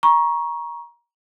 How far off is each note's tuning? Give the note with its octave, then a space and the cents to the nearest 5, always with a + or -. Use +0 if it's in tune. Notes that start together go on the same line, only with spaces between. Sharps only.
A#5 +25 C#6 +0